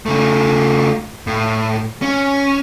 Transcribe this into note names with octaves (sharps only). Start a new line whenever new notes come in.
C#3 A3
A2
C#4